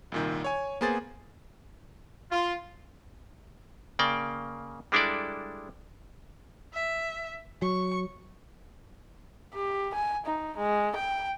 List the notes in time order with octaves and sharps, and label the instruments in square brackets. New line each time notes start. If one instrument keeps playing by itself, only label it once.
[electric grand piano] C2 A#2 D#3
C#5 G#5
A#3 B3 G#4 C5 A6
[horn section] F4
[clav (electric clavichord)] C#3 A#3 D5 G5
G3 G#3 D4 E4 A4 D5
[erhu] E5
[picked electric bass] F#3 [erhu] C#6
[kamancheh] G4
G#5
D#4
G#3
G5